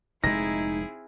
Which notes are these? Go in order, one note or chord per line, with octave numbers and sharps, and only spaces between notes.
F1 A#2 G#3 C4 D#4 E4 G#4 A#6